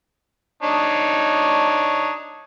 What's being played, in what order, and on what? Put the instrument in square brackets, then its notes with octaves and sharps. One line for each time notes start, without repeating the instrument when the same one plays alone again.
[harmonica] D4 D#4 C#5